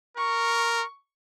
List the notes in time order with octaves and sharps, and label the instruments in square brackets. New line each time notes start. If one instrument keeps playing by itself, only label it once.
[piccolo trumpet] A#4 [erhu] C#6